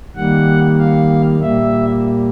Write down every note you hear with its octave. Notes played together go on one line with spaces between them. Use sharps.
D#3 G3 A#3 F#5
F5
A#2 G3 A#3 E5